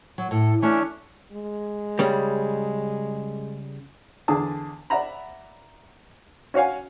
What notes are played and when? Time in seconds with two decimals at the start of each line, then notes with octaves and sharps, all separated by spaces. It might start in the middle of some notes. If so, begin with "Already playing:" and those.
0.18 F#3
0.31 A2 A4
0.62 E3 A3 C#4 D4 C#5 D5
1.32 G#3
1.99 C#3 G3
4.28 E2 D3 G#4 A5
4.90 D5 E5 F#5 A#5 B5
6.54 C#4 F#4 C#5 F5 G#5